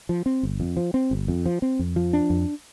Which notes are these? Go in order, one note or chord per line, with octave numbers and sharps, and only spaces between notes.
F3
C4
G1
F2
F3
C4
G1
F2
F3
C4
F2
F3
D4
F2